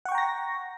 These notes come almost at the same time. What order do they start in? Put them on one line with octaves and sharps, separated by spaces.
F#5 C#6 G5 A#5 A#6